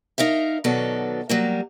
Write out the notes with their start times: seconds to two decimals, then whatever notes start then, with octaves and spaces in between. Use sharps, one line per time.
0.18 D#4 A#4 E5 F5
0.64 B2 D#3 F#3 B3 A4 D5
1.29 F#3 G3 A#3